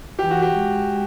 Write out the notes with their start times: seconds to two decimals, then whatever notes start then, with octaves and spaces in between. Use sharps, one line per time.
0.19 E3 G4
0.30 F#4
0.42 G4
0.58 G#3